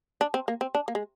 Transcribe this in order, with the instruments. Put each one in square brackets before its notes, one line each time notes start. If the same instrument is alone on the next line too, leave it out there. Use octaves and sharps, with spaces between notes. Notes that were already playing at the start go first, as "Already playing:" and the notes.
[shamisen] D4
C4
A#3
C4
D4
A#3
G#3